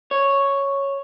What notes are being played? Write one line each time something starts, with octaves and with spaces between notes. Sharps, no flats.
C#5